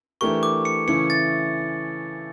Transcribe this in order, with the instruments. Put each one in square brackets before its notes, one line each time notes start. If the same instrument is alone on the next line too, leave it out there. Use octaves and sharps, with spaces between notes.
[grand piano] E3 A3 D4 G4 A#4 [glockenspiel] C#6
[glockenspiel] D6
C#7
[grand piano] C#3 E3 A3 C#4 E4 [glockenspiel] C#7
[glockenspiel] A6